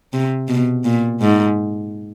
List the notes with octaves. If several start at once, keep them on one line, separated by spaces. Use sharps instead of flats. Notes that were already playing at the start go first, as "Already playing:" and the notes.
C3
B2
A#2
G#2